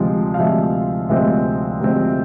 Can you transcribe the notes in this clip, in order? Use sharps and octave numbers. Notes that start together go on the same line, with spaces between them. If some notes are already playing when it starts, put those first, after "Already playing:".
Already playing: D2 C3 F3 G#3 C4
F5
D2 C3 F3 G#3 C4 E5
D2 C3 F3 G#3 C4 E5
D2 C3 F3 G#3 C4